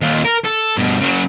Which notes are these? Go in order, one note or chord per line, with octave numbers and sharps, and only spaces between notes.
D#2 F4
A#4
A4
G2 B2
C#3 F#3